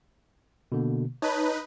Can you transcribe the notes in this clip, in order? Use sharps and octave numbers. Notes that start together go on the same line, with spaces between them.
B2 D3 A#3
D#4 B4 C#5 A5